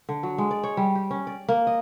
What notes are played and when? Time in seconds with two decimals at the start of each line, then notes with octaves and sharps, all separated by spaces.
0.09 D3
0.23 F#3
0.38 G#3
0.51 D5
0.63 C#5
0.77 G3
0.95 G4
1.11 C#4
1.27 D5
1.48 A#3
1.67 D#5